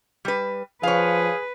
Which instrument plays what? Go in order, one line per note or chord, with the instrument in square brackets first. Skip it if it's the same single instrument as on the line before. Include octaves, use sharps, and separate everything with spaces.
[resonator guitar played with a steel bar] G3 B4
[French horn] F3 [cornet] G#4 [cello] B4 [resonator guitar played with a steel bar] C#5 F5